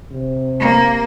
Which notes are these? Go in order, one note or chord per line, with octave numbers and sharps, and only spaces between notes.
C3
A#3